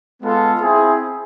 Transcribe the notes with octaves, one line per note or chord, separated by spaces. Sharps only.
G#3 B3 F4 A4
C4 E4 G#4